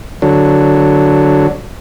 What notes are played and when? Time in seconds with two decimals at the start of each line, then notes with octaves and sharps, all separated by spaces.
0.22 D3 F#3